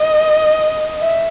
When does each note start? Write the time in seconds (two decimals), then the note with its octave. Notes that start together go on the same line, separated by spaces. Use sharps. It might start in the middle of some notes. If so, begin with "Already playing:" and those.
Already playing: D#5
0.99 E5